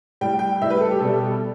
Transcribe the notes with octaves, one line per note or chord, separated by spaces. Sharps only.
A2 G3 G5
G5
A2 G3 E5
B4
A4
G4
B2 G3 A4